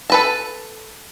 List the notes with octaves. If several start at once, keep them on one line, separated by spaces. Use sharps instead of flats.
A4 B4 A5